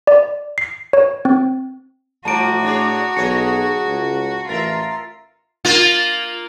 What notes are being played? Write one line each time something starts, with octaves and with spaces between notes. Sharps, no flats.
D5
C7
C#5
C4
A2 F3 G3 F#4 A5 A#5 D7
D4 G#4 C#5
B1 G#4 C#5 D#5 C#7
C#2
A1 F4 A#4 E5 A6
A#3 F4